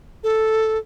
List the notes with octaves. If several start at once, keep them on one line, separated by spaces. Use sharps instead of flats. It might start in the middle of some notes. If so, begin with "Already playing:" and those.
A4